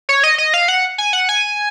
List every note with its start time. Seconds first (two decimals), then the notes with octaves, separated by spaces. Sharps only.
0.09 C#5
0.24 D#5
0.38 D#5
0.54 F5
0.68 F#5
0.98 G#5
1.13 F#5
1.29 G#5